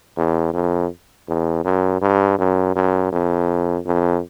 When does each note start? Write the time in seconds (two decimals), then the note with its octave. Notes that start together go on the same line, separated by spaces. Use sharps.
0.17 E2
0.54 F2
1.28 E2
1.64 F#2
2.02 G2
2.39 F#2
2.75 F#2
3.12 F2
3.86 F2